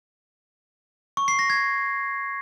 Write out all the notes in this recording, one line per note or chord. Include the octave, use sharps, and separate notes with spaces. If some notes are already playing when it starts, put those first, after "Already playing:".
C#6
C7
A#6
G#6